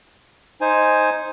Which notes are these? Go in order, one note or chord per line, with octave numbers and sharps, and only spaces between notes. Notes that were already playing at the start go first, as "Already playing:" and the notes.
D#4 C5 G#5